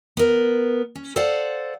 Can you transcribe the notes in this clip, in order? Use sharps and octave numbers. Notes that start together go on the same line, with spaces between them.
B3 A#4
C#4
A4 C5 D5 F5 F#5